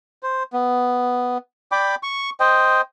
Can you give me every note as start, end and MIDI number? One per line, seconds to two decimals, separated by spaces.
0.23 0.43 72
0.53 1.38 59
1.72 1.95 74
1.72 1.95 79
1.72 1.95 83
1.72 1.95 86
2.03 2.30 85
2.40 2.81 72
2.40 2.81 75
2.40 2.81 79